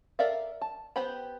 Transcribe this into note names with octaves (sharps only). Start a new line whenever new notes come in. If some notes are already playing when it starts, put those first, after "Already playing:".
A4 A#4 D5 E5 F5
A5
B3 G4 C5 G5 B5